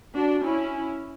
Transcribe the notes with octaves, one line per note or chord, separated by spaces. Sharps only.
D4 F#4
C#4 E4